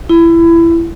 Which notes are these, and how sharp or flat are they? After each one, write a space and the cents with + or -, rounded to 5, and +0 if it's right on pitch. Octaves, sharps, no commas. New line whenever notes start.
E4 +20